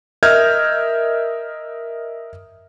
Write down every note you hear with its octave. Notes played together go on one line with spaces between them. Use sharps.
A#4 D#5 E5 F6 G6 G#6